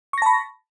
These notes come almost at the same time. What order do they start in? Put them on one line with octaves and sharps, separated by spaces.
C#6 A#6 A5 B5